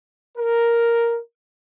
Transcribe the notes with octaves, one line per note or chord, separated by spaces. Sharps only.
A#4